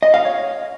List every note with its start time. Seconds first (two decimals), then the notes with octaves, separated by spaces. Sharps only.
0.03 D#5
0.14 F5
0.25 C#5